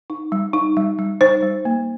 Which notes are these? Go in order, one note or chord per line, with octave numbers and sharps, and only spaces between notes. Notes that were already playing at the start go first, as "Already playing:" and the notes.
D#4
G3
D#4
G3
G3
D#4 C5
G3
A#3